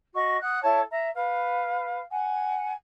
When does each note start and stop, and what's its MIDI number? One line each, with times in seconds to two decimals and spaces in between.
0.14 0.40 66
0.14 0.40 75
0.14 0.40 85
0.42 0.60 78
0.42 0.60 87
0.42 0.60 90
0.63 0.81 64
0.63 0.81 69
0.63 0.81 73
0.63 0.81 81
0.90 1.09 76
0.90 1.09 82
1.14 2.01 71
1.14 2.01 77
2.12 2.73 78
2.12 2.73 80